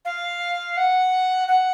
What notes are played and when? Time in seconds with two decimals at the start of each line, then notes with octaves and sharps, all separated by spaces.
0.05 F5
0.77 F#5
1.48 F#5